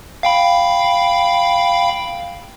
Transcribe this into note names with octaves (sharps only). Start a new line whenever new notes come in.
F5 G5 B5